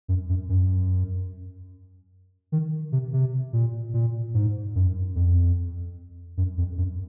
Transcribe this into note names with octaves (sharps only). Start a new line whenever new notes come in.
F#2
F#2
F#2
D#3
C3
C3
A#2
A#2
G#2
F#2
F2
F#2
F2
F#2